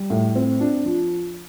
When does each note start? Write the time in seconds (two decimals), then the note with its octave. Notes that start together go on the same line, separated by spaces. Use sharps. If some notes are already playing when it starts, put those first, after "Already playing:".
Already playing: G3
0.10 A2
0.35 C4
0.60 D4
0.85 F3